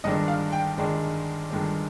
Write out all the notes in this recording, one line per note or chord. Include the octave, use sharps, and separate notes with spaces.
G1 G2 D#3 G#3 D4 D#5
F5
G5
G1 G2 D#3 G#3 D4
G1 G2 D#3 G#3 D4